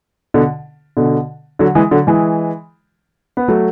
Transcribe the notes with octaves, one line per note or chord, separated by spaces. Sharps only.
B2 D3
B2 D3
D3 F#3
E3 G#3
D3 F#3
E3 G#3
B3
F#3 A3